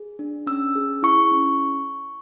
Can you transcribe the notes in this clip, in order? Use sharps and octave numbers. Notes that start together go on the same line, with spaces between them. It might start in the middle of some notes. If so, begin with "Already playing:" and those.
Already playing: G#4
D4
C#4 E6
G#4
E4 C#6
C#4